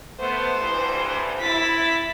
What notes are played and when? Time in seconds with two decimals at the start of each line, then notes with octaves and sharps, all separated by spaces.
0.19 A3 B3 C5
0.57 D2 G2 E3
1.40 E4 A6 B6